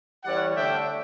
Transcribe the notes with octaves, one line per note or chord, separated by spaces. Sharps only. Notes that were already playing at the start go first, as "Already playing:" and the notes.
E3 G3 C#4 D5 F#5
D3 A3 D4 E5 G5